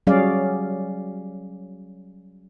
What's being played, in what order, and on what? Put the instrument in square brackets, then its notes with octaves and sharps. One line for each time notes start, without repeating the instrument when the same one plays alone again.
[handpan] F#3 G3 C#4 G#4 D5 F5